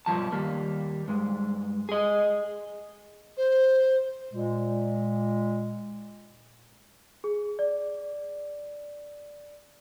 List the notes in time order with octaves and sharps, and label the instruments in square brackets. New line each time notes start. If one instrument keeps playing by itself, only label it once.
[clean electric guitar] B1 G2 B2 F3 A5
D#2 G3 A#3
G2 G#3
G#4 D#5
[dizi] C5
[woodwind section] A#2 G#3
[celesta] G#4
D5